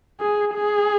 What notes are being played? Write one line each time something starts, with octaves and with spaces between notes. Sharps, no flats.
G#4
G#4